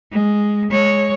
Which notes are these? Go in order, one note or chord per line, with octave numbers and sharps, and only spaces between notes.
G#3
G#3 C#5